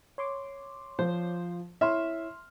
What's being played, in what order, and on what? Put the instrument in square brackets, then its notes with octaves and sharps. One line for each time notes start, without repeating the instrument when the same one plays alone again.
[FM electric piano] C#5 C6 D6
[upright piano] F3 [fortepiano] C5
[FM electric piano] E4 C#5 [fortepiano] E5 [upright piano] C6 F6